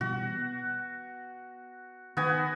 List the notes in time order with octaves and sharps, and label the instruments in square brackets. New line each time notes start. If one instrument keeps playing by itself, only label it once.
[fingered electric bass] B2 E3 G3 [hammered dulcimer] F#4
[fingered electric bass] B3
[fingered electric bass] D#3 [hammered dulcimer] B3 F#4 G#5